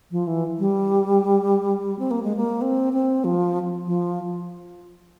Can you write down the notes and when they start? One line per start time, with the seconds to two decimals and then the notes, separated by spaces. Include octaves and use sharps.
0.11 F3
0.27 E3
0.59 G3
1.99 C4
2.11 A#3
2.23 G#3
2.37 A#3
2.62 C4
2.93 C4
3.24 F3
3.86 F3